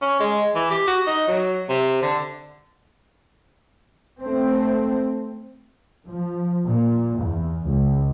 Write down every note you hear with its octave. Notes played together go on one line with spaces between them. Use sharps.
C#4
G#3
E3
G4
F#4
D#4
F#3
C3
D3
A3 C4
F3
A#2
E2
C#2